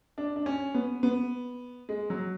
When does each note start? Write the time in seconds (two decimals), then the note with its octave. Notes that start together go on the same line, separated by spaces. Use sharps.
0.18 D4
0.36 D4
0.46 C#4
0.75 B3
1.03 B3
1.89 G#3
2.10 F#3